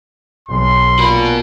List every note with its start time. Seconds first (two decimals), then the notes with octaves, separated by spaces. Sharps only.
0.49 B1 C6
0.99 A#2 F#4 B5